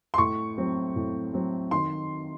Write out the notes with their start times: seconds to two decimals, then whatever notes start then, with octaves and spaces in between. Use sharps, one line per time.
0.14 C6
0.18 A2 C#6
0.58 F#3 C4
0.96 A2
1.33 F#3 C4
1.71 D#3 C6